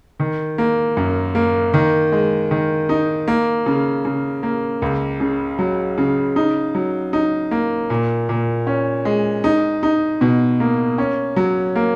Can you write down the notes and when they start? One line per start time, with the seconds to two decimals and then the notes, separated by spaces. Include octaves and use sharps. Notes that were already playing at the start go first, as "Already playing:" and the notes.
0.20 D#3
0.58 A#3
0.97 F#2
1.35 A#3
1.74 D#3
2.12 G#3
2.51 D#3
2.89 D#4
3.28 A#3
3.66 C#3
4.05 C#3
4.43 A#3
4.82 C#2
5.20 C#3
5.59 F#3
5.98 C#3
6.36 D#4
6.75 F#3
7.13 D#4
7.51 A#3
7.90 A#2
8.29 A#2
8.67 C#4
9.05 G#3
9.44 D#4
9.83 D#4
10.21 B2
10.60 A#3
10.98 C#4
11.36 F#3
11.76 A#3